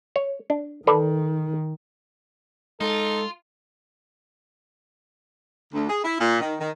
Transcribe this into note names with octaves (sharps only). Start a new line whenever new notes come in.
C#5
D4
D#3 A4 B4 D5
G#3 D#4 F4 A4
D2
G#4
E4
A#2
D#3
D#3